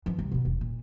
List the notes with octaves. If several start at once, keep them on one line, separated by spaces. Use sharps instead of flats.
E3 F3
C2
B2 D#3
E1
A#2